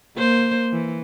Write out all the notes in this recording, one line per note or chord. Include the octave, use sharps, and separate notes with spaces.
A#3 C5
E3